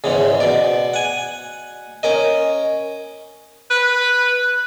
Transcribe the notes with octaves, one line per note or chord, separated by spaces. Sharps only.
E2 G#2 C#3
B2 D5
F#5 G#5
C#4 A#4 D#5
B4